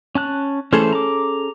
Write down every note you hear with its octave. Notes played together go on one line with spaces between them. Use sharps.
C#4 A5 F#6
E3 A3 C#4 G#4 A4 C5
A#5 D6